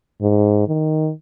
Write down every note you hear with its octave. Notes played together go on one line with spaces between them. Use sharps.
G#2
D#3